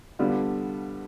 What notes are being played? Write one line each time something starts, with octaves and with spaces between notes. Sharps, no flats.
D3 G3 B3 D4 F4